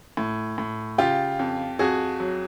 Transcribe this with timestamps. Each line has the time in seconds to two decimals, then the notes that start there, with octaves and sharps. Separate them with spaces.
0.17 A2
0.58 A2
0.98 C#3 F4 G4
1.39 F2
1.79 F2 F#4 G#4
2.20 F#3